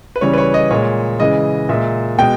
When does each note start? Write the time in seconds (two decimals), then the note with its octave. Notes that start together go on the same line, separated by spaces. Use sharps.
0.16 B4
0.21 C#3 E3 G3 C#5
0.33 B4
0.38 C#5
0.54 D#5
0.71 A#2 G#3 C#5
1.20 C#3 E3 G#3 D#5
1.69 A#2 G#3 E5
2.19 B2 G#3 G5